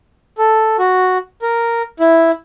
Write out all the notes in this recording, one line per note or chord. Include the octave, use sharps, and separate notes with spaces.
A4
F#4
A#4
E4